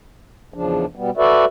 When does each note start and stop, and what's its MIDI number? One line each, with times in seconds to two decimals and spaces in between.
0.54 0.85 40
0.54 0.85 49
0.54 0.85 53
0.54 0.85 62
0.96 1.10 47
0.96 1.10 55
0.96 1.10 59
1.17 1.45 66
1.17 1.45 69
1.17 1.45 71
1.17 1.45 74
1.17 1.45 76